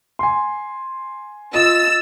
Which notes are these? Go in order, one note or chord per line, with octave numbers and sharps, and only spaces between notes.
G#5 C6
F4 D#5 E6 A6